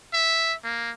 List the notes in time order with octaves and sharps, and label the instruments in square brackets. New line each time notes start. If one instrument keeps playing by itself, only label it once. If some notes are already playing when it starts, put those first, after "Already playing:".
[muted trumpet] E5
A#3